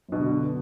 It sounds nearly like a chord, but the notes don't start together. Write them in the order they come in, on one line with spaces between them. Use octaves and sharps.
F#2 B2 D3